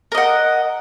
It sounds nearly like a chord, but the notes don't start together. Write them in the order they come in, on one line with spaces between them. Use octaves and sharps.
A#4 D#5 F#5